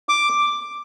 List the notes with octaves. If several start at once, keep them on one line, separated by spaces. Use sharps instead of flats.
D6